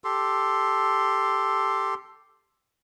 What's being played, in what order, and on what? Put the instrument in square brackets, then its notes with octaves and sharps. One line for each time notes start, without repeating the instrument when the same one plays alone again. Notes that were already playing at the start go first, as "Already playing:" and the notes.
[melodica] G4 A4 C6